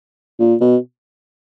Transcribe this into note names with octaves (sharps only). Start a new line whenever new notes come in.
A#2
B2